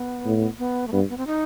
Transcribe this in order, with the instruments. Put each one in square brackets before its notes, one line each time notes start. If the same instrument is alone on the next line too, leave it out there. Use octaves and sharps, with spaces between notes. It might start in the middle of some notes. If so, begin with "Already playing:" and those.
Already playing: [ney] B3
[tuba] A2
[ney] B3
A3
[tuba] G2 [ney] B3
[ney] B3
C4
D#4